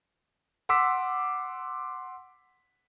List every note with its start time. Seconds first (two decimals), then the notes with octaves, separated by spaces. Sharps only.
0.69 F#5 C6 D6 E6 B6